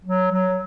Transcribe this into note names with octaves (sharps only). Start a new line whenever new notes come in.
F#3
F#3